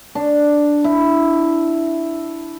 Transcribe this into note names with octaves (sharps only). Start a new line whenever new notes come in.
D4
E4